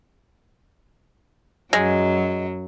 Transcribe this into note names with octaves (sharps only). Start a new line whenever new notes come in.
F#2 F#3 G#3